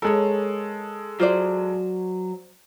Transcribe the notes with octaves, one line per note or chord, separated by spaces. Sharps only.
G#3 A4 A#4 C#5
F#3 F4 C5 D5